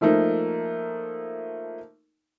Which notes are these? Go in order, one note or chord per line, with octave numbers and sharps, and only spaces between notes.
F3 A3 A#3 D#4